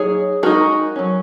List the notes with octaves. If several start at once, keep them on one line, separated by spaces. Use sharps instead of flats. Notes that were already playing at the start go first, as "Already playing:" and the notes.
Already playing: F#3 A#3 D#4 G#4 C#5
G#3 D#4 F#4 A#4
F#3 C#4